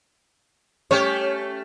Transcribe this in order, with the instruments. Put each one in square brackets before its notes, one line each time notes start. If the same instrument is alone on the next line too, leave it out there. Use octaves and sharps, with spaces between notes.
[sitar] A3 C#4 G4 [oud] C#5